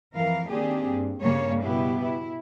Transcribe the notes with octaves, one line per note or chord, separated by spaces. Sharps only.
F2 E3 A#4 F5
D#3 A#3 C4 D4 G4 G#4
G2
G2 C#3 G3 A#3 C#5
B2 B3 E4 G4
E4